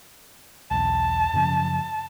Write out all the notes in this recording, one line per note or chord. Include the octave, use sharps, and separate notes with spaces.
B1 E2 A5
F#2 C#3 F3